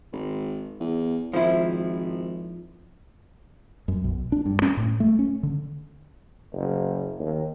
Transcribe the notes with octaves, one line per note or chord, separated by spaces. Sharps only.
G#1
E2
G#1 F3 E4
F#2
B1
D4
G2
C#4
A2
A3
C#4
D3
F#1
D#2